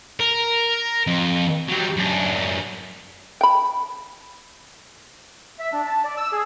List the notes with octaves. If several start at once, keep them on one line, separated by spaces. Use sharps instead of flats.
A#4
F2
F#3 G3
F#2 D4
G5 B5
E5
D4
A5
D5
E6
G#4